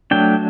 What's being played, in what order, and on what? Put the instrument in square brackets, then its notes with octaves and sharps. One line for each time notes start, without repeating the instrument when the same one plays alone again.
[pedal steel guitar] F#3 A3 D4 G5